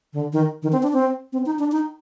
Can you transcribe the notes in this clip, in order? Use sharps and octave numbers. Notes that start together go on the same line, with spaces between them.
D3
D#3
D#3
C4
D4
C4
C4
D#4
D4
D#4